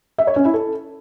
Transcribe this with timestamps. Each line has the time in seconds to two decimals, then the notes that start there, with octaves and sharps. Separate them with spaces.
0.18 E5
0.27 C#5
0.36 C#4
0.45 E4
0.54 A4